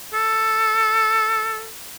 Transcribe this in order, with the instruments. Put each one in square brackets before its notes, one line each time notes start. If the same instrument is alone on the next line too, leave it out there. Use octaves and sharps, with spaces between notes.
[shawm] A4